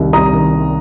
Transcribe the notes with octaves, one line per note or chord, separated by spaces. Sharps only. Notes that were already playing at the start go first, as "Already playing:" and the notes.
Already playing: C2 D#3
C2 A#5 D#6
D#3